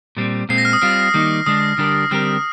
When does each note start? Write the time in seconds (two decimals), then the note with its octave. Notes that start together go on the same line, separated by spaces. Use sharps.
0.17 A#2 G3 C4
0.49 A#2 G#3 C4 C7
0.58 A#6
0.65 F6
0.73 D#6
0.82 G3 C4 F4 F6
1.14 D#3 G3 A#3 D#4
1.46 D3 G#3 D4 D#6
1.78 D3 G3 D4 G4 A#4
2.11 D3 G3 C4 G4 A#4 F6